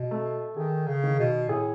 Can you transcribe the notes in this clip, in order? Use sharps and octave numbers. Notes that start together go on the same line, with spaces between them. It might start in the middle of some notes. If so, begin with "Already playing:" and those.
Already playing: B2
A3
D#3 G#4
C#3
D#3
B2
A2 G#4